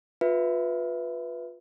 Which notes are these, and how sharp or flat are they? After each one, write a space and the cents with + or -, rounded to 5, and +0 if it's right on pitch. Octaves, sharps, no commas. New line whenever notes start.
F4 +30 B4 +0 E5 +0